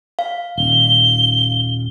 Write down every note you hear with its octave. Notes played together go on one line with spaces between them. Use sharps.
F5
D#1 G7